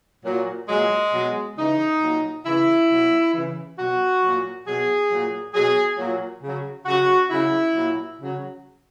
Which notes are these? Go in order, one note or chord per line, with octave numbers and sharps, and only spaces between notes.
A#2 F#3
A#2 F#3 G#3
B2 F#3
C#3 E3 D#4
A#2 F#3
C#3 E3 E4
B2 F#3
C#3 E3
B2 F#3 F#4
A#2 F#3
B2 F#3 G#4
A#2 F#3
B2 F#3 G#4
A#2 F#3
C#3 F#3
C#3 F#3 F#4
C#3 F#3 E4
A#2 F#3
C#3 F#3